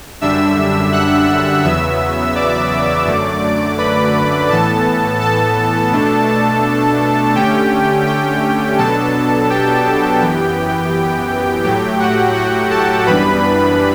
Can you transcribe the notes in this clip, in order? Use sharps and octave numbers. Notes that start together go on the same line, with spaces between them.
F#2 D3 G3 D4 E5 E6
F#5 F#6
E2 C#3 F#3 B3 E5 E6
D5 D6
F#2 D3 F#3 A3
B4 B5
A2 E3 B3 A4 A5
A4 A5
B2 A3 D4
D3 A3 C#4 G4 G5
G4 G5
B2 F#3 B3 D4 A4 A5
G4 G5
F#2 E3 B3
A2 F#3 A3 G4 G5
F#4 F#5
F#4 F#5
A4 A5
F#2 E3 G3 B3 D4 B4 B5